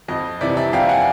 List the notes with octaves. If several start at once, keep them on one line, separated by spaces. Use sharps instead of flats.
F2 D#5
C3 E3 D5 E5
D5 E5
F2 F5 G5
F#5 G#5